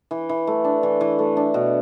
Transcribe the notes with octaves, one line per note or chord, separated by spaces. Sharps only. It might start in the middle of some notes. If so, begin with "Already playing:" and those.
E3
E3
A3
D4
E3
E3
A3
D4
B2